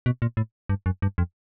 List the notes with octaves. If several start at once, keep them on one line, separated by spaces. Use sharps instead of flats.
B2
A#2
A2
G2
F#2
G2
F2